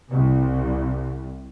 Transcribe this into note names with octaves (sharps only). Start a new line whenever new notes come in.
C2